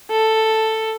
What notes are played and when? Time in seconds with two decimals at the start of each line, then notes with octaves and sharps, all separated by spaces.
0.10 A4